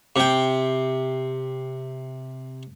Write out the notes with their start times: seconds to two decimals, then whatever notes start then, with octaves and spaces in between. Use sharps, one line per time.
0.16 C3 G5